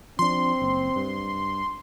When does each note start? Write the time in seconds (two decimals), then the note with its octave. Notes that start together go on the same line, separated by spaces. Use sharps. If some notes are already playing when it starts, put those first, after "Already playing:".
0.19 F3 C4 D4 C6
0.62 F#1
0.96 G2